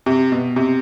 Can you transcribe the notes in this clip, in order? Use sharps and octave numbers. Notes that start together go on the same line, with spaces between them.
C3
B2
C3